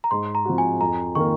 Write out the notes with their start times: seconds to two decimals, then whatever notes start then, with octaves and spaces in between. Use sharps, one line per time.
0.04 A#5
0.11 G#2 C6
0.35 A#5
0.45 F3 C4 F#4
0.58 G#5
0.80 F2 A#5
1.15 D#3 A#3 F4 A#4 C#6